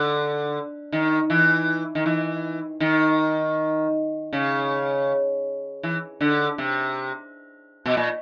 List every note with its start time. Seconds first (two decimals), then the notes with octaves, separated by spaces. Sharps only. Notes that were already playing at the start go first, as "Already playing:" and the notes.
Already playing: D3
0.92 D#3
1.30 E3
1.95 D#3
2.06 E3
2.80 D#3
4.33 C#3
5.83 E3
6.20 D3
6.58 C3
7.86 B2
7.97 A#2